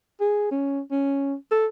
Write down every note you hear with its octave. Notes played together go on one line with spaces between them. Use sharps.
G#4
C#4
C#4
A4